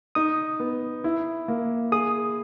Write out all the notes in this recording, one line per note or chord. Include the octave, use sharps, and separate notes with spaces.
D#4 D#6
B3
E4
A#3
G#4 D#6